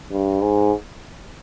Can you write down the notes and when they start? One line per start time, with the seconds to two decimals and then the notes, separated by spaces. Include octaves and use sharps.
0.12 G2
0.42 G#2